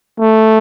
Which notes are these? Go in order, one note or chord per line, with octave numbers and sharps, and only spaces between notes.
A3